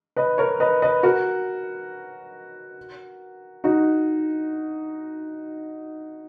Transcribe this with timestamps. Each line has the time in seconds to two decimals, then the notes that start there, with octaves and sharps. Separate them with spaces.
0.16 B4 D#5
0.38 A#4 C#5
0.60 B4 D#5
0.82 B4 D#5
1.03 F#4 A#4
3.64 D#4 F#4